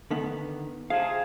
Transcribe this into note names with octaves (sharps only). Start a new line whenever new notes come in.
D3 D#3 B3
C3 F3 G#4 F5